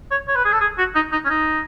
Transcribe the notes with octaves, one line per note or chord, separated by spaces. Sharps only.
C#5
C#5
B4
G#4
A4
G#4
F#4
D#4
D#4
C#4
D#4